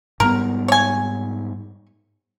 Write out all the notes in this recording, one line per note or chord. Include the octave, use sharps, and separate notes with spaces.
G#2 G3 B3 A#4
C#5 G#5